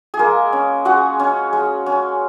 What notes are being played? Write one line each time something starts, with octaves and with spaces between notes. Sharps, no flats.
G#4
G#3 A#3 A#4
C#4
G#3 F#4 F#5
C#4
G#3
C#4